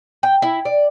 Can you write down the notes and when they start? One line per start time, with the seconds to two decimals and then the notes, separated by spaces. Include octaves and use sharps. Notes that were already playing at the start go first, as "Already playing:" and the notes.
0.23 G5
0.42 E4
0.65 D5